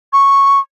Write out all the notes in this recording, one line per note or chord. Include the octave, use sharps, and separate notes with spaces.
C#6